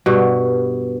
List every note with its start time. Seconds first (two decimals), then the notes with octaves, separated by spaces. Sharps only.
0.06 G2 B2